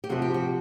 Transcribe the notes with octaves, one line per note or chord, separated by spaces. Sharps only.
G4
C3 F3 F#4
G4
F#4